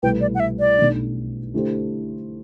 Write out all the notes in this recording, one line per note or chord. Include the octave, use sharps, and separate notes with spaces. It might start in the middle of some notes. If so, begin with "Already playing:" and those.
C2 B2 A3 E4 B4 G5
D5
F#5
E5
D5
B1 B2 A3 D4
D3 A3 E4 G4 C5